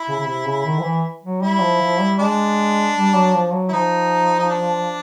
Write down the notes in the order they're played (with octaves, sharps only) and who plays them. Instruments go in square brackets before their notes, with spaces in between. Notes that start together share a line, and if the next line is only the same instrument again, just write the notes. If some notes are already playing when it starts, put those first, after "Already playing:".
Already playing: [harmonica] E4
[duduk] C#3
C#3
C3
C#3
D#3
F3
E3
F#3
[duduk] G3 [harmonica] E4
[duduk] F3
F3
G3
[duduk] G#3 [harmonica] D4
[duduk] G3
F#3
F3
F#3
[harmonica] E4
[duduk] F3 [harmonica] D#4
[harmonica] D#4
D4